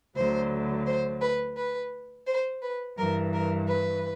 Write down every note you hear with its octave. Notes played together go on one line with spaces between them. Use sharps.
D2 D3 F#3 C5
C5
B4
B4
C5
B4
G2 E3 A#4
A#4
B4